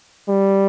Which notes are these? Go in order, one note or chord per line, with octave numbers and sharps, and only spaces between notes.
G3